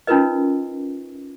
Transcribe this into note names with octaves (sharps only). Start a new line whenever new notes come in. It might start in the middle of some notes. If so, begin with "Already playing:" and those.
C#4 D#4 F4 A#4 B4 D#5